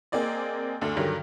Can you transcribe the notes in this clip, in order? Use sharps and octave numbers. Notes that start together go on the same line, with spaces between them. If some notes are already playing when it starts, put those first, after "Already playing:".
A#3 C4 G#4 D5 D#5
D2 D4 A4
G2 D3 D#3 F#3